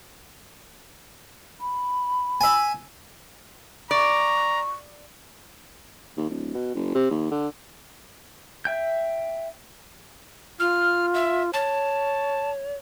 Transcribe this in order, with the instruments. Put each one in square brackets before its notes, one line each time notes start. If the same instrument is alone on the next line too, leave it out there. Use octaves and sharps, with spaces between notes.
[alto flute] B5
[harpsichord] E5 G#5
[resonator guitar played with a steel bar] D5 [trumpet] A#5 [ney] C#6
[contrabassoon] D#2
D1
B2
F#1
C3
D#2
D3
[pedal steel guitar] E5 G5 G6
[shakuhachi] F4 [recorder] F6
[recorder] E5
[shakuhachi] C#5 [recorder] A5